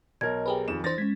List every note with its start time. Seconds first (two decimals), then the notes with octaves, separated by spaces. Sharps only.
0.21 B1 A#4 D#5 G#6
0.46 G4 G#4 B4
0.68 F2 D#3 E7
0.84 E3 D4 C5 A6 A#6
0.98 G#3 C#4 G#6 B6